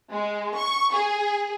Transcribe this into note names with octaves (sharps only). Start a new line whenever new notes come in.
G#3
C#6
G#4